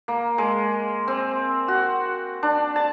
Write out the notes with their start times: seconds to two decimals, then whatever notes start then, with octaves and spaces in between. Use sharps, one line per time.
0.08 A#3
0.38 G#3
1.08 C4
1.68 F#4
2.43 D4
2.76 A5